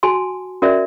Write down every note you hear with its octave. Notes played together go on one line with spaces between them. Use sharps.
F#4 G#5 A5 C6
C#4 F#4 A#4 D5 E5